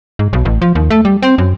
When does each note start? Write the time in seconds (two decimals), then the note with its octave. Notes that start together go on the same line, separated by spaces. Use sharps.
0.19 G#2
0.33 B1
0.45 A1
0.62 F3
0.75 D#2
0.90 A3
1.05 G3
1.23 C4
1.38 F#2